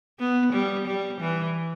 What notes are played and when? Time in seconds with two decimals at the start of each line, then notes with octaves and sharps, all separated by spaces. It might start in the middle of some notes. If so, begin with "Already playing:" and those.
0.19 B3
0.53 G3
0.87 G3
1.21 E3